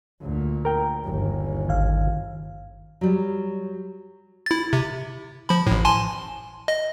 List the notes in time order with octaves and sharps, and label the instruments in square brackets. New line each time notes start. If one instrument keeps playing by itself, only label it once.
[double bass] D2 A#2
[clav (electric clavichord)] A#4 G5
[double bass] G1 D#2
[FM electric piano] G#1 D#3 F5
[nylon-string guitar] F#3 G3
[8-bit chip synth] E4 A6
C3
F3 B5
A1 A2
G#5 A5 C6
D#5